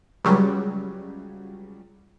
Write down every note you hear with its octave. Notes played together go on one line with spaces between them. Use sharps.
C#2 C#3 F#3 G3